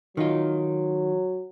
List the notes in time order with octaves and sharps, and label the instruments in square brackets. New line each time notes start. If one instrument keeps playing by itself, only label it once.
[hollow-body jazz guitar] D#3 D#4 F4 [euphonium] F#3